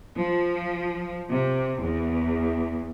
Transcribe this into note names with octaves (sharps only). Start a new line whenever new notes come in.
F3
C3
E2